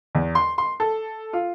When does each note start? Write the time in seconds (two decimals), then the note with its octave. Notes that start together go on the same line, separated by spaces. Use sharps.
0.15 E2
0.35 C6
0.58 C6
0.80 A4
1.33 F4